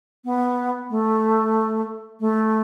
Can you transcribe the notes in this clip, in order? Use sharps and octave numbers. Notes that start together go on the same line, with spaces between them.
B3
A3
A3